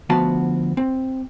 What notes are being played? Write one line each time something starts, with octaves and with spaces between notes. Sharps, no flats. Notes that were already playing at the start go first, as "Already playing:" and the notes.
D2 F3 B3 F#4 F5 A5
C4